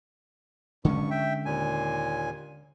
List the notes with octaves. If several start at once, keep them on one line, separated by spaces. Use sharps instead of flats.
G2 D3 G#3 C#4 C#6
E5 G5
D#2 A#2 G#5